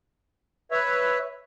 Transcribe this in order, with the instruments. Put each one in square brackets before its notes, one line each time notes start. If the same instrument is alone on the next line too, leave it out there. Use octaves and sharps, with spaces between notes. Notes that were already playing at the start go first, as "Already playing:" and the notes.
[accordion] B4 C#5 E5